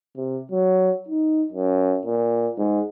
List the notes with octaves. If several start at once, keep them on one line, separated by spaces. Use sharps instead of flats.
C3
F#3
D#4
F#2
A#2
G#2